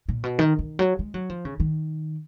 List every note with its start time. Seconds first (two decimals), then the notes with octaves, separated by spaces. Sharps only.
0.09 A#2
0.24 B2
0.39 D#3
0.59 D#3
0.79 F#3
0.99 G#3
1.14 F#3
1.30 F3
1.45 C#3
1.60 D#3